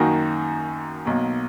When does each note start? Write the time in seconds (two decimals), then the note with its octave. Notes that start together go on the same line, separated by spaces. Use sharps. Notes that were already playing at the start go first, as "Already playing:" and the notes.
Already playing: F#2 D#3 A#3 D#4 F#4
1.05 B1 B2 A#3